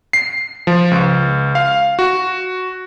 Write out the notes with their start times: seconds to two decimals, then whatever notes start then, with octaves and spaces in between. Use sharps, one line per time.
0.13 C7
0.67 F3
0.91 C#2
1.55 F5
1.99 F#4